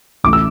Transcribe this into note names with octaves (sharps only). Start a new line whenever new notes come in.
A1 E3 A3 D6
E6